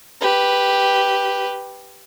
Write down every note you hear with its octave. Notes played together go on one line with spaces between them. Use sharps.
G4 B4